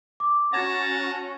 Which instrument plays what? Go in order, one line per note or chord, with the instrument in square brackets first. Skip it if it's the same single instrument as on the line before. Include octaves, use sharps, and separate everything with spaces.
[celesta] D6
[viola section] C#4 F#4 [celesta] F#5 G#6 A6 [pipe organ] A5 A#5